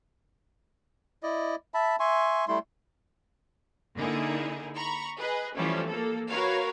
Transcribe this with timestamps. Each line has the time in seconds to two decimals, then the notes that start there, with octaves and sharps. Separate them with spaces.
1.23 E4 D5 D#5
1.74 E5 A5 B5
2.00 E5 G#5 C6 C#6
2.48 G3 A3 E4 C6
3.97 D3 A#3 D#4 E4 G#4 A#4
4.77 A#5 B5 C#6
5.18 G#4 B4 D#5
5.56 E3 F3 G3 A3 C#4
5.87 A#3 A4
6.29 F#4 A#4 B4 C#5 F5